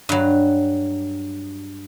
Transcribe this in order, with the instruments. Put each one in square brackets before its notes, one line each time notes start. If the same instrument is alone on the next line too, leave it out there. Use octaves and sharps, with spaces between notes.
[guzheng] G2 F#3